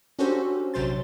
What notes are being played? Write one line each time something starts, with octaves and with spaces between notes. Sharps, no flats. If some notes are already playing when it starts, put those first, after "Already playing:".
C#4 D4 F#4 G4 A4 C5
A#1 C3 F#3 C5 C6 A6